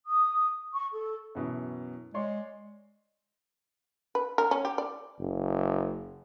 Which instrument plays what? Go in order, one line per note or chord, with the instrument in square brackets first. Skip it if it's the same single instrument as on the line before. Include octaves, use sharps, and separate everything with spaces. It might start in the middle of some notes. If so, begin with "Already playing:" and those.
[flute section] D#6
C#6
A4
[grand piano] F#2 B2 E3
[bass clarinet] G#3 [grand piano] C#5 D5 C6
[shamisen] B4
A#4
C#4
G4
D5
[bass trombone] F#1